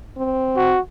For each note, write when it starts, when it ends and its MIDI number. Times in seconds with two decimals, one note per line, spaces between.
0.17 0.74 60
0.57 0.79 66